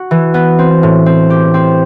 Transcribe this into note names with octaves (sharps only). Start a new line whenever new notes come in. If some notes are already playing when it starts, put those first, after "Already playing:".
Already playing: F#4
E3
B3
C4
A2
C4
G4
C4